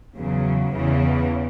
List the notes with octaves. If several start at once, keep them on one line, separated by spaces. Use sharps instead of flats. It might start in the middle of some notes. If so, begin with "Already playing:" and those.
E2 C#3 F#3
E2 C#3 E3